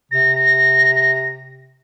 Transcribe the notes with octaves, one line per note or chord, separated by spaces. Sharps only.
C3 A#6